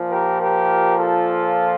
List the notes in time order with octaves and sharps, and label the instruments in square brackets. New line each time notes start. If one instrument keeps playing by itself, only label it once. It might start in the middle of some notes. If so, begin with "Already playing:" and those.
Already playing: [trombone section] A#2 F3
G4 A#4
G4 A#4
F4 A4